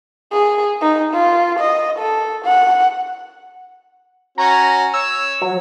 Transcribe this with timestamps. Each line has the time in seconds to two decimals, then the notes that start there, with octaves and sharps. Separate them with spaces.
0.32 G#4
0.81 D#4
1.13 F4
1.59 D#5
1.99 A4
2.45 F#5
4.38 C#4 F#4 A#5
4.94 C#5 E6
5.42 F#3